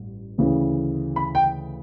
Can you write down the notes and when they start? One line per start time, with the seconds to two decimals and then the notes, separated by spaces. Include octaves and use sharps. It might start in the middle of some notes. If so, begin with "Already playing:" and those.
Already playing: A1 G2
0.38 D2 C#3 E3
1.16 B5
1.35 G5